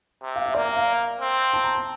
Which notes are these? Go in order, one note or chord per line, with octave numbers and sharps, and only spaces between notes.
C3
F5
E5
A#3 D5
E5
F5
C4
A5
A#5
A5